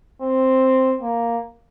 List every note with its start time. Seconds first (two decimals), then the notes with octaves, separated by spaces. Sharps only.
0.22 C4
1.02 A#3